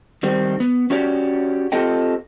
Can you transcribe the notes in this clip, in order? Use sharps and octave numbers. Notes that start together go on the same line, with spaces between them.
D#3 G3 C4
B3
C#4 F#4 G4 C#5 D5
C4 F4 G4 A4 D#5 G5